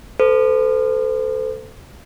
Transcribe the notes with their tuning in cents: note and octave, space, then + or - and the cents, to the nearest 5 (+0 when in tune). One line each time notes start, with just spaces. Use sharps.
A4 +5 C5 -40